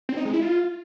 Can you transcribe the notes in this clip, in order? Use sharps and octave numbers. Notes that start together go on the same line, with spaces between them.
C4
D#4
G#3
E4
F4